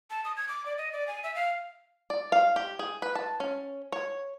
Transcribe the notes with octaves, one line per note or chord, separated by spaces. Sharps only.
A5
D#6
G#6
D6
D5
D#5
D5
G#5
E5
F5
D5
F5
G4
G#4
B4
A5
C#4
C#5